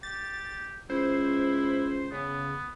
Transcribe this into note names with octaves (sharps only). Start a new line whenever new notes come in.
G4 A6
C#2 E4 C5
C#3 B3